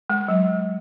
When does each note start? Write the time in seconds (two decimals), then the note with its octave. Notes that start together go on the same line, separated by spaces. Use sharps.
0.10 G#3
0.28 F#3